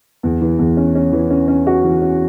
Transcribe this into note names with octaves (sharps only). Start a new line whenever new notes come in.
E2
E3
E2
C#4
C#4
E3
C#4
C#4
F#4
E3
C#4